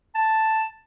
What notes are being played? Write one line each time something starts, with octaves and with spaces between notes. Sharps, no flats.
A5